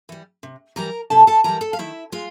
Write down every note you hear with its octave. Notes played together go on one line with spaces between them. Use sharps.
E3 G3
C3
E3 G3 A#4 A#5
C3 A4 A5
A4 A5
E3 G3 A#4 A#5
A4 A5
F5
D#3 E4 E5
G#3 F4 F5